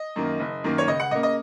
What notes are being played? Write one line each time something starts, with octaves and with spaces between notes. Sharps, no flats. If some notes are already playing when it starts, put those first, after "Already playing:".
Already playing: D#5
F#2 D#3 A#3
F#1
F#2 D#3 A#3
C#5
C#2 D#5
F#5
C#3 A#3 D#5
D#5